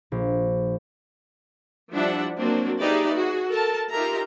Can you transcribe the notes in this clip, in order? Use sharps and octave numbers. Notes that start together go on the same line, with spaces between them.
A#1
F3 G3 D4 E4 E5 F#5
F#3 A#3 C4 D4 F#4
D#4 G4 G#4 B4 D5 E5
F#4 G#4
A4 A#4 A5
D#4 F4 G4 A#4 E5 A#5